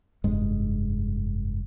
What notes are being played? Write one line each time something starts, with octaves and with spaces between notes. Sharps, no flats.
F1 G2 G#3